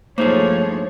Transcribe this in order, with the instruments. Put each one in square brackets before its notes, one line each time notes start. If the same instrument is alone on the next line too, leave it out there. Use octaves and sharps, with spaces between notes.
[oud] G2 A3 [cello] F3 C#5 [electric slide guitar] A#3 D#4 G#4 [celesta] C5